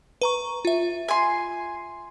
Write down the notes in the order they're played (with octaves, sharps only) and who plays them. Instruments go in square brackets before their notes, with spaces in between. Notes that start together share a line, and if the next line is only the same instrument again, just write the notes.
[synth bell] B4 A#5 C#6
F4 E5
[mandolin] G#5 C6